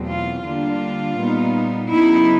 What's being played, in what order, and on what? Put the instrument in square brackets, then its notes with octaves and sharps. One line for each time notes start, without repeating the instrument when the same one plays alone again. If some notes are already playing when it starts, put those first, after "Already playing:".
Already playing: [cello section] E2 B2 F#3 A3 C4
F4
D3 G3 A#3 D4 F4
A#2 G3 B3 D#4
C#3 F#3 B3 D#4 E4